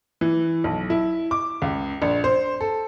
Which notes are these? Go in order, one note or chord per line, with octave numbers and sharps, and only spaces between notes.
E3
B1
E4
D6
C#2
A#1
C5
A4